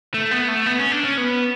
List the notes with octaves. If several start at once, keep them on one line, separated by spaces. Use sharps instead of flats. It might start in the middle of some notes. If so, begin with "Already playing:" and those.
A3
B3
A3
B3
C#4
D4
C#4
B3